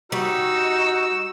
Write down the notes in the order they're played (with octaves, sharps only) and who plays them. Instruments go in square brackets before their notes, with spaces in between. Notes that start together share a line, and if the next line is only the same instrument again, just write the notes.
[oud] G3 [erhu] D#4 [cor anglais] F#4 [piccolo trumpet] E6